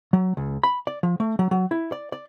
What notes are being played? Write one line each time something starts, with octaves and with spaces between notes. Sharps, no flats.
F#3
C#2
B5
D5
F3
A3
F#3
F#3
E4
D5
D5